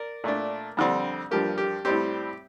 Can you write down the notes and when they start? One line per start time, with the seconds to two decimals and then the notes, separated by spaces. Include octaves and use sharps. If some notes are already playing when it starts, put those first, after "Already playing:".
Already playing: A#4 D5
0.24 A#2 A3 D4
0.77 F2 D3 G3 C4
1.31 G2 F3 A#3 G4
1.58 G4
1.85 A2 G3 C4 G4